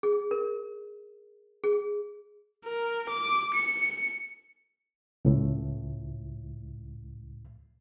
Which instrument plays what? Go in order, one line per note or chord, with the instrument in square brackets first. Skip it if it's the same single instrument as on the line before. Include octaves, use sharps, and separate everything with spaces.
[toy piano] G#4
A#4
G#4
[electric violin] A#4
D6
C#7
[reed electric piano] C#2 A2